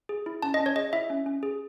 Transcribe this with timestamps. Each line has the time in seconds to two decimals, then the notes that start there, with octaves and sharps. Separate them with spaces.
0.09 G#4
0.26 E4
0.42 C#4 A5
0.54 D#5
0.60 C#4
0.66 C#5
0.76 G#4 D#5
0.93 E4 E5
1.10 C#4
1.26 C#4
1.43 G#4